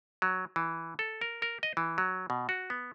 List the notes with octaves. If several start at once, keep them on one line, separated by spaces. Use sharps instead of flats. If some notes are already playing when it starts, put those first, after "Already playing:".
F#3
E3
A4
A#4
A#4
D#5
E3
F#3
B2
F#4
B3